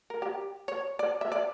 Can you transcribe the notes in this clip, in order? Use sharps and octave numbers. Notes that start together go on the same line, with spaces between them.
A#4
G4
C#5
D5
E5
D5